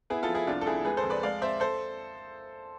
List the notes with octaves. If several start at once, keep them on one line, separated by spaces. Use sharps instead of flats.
B3 E4 G#4
F4 A4
F3
E4 G#4
C2 D4 F4
A4
C2 E4 G#4
G#3 G#4 B4
A4 C5
F2
B4 D5
G#3 D5 F5
C4 C5 E5
A4 C5